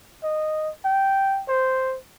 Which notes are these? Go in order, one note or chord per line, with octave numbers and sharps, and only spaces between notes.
D#5
G5
C5